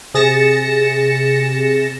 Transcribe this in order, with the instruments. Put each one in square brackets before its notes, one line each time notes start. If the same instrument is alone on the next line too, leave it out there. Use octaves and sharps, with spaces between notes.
[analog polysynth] C3 G#4 A6 A#6 C#7 E7